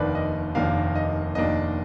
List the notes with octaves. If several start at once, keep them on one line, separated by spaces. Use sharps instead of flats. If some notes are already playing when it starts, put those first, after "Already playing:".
Already playing: F1 D#2 D#3 A#3 D4 B4 D5
D#5
F1 D#2 D#3 A#3 D4 F5
D#5
F1 D#2 D#3 A#3 D4 D#5